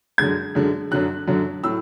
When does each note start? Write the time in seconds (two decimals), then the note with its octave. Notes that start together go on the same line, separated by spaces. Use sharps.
0.18 F#2 D3 G#3 G#6
0.55 F#2 D3 G#3
0.91 F#2 D3 F#3 F#6
1.27 F#2 D3 F#3
1.63 A2 F#3 E6